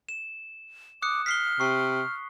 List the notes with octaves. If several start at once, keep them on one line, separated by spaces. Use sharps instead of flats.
E7
D6 D#6 F#6 C#7
F6 B6 C7 G7
C3 C#6 C7